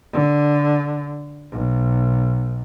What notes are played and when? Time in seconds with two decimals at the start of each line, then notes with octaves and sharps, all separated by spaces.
0.13 D3
1.51 B1